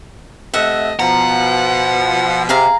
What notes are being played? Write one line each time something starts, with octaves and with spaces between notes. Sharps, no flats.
C3 A3 D#5 E5 F#5
B2 F3 F#5 A#5
C3 G#4 F5 A#5